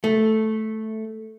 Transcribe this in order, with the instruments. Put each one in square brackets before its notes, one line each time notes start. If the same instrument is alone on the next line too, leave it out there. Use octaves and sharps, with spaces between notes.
[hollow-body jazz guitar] A3